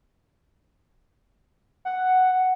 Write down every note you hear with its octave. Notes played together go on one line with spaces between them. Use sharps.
F#5